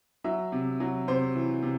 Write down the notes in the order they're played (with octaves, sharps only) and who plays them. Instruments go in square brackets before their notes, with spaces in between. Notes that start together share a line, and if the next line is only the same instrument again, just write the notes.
[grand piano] F#3 E5
C3
F#3
C3 C5
E3
C3